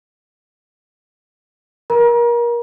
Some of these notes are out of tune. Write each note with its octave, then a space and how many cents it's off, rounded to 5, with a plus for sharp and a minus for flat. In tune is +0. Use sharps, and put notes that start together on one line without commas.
A#4 +25 A#5 +35